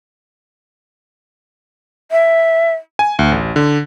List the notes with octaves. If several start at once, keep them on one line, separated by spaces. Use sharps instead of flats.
E5
G#5
D2
A1
D3